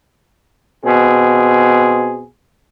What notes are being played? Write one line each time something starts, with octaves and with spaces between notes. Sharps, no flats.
B2 C4 G#4